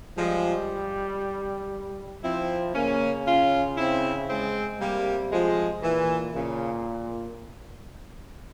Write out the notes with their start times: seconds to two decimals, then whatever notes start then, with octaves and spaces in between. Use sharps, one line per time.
0.18 F3 G3 G#3
2.23 F3 C4 E4
2.74 C#3 A#3 C#4
3.26 C#4 F4
3.77 C4 E4
4.28 G#3 C4
4.80 C3 G3 A#3
5.32 F3 G#3
5.83 A#2 E3
6.34 A#2 C#3